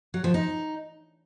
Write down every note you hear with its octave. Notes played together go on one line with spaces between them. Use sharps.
F#3
F3
D#4